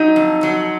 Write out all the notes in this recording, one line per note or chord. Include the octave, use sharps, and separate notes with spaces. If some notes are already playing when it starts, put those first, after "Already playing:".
Already playing: F#3 D#4
F2
F#3